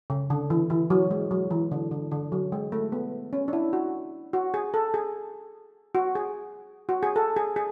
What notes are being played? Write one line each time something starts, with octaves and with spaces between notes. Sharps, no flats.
C#3
D3
E3
E3
F#3
G#3
F#3
E3
D3
D3
D3
F#3
G#3
A3
B3
C#4
D4
E4
F#4
F#4
G#4
A4
G#4
F#4
G#4
F#4
G#4
A4
G#4
G#4